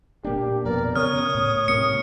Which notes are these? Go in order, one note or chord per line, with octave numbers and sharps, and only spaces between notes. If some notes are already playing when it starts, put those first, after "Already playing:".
A#2 A#3 D4 G4
F2 B2 B3 A#4 D5
C#3 B3 C#4 C#5 D#6 F6
A2
G#2 C3 A#3 C#7